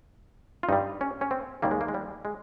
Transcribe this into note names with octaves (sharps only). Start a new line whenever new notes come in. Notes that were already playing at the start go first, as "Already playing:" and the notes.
F4
G2 G3 D#4
C#4
C#4
C4
D#2 D#3 G3 A#3
G#3
A#3
G#3
G3
G#3